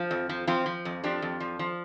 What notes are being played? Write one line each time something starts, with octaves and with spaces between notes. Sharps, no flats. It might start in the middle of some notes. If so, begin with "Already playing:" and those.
Already playing: F3
F2
F3
F3 C4 F4
F3
F2
F3 D4 G4
F2
F3
F3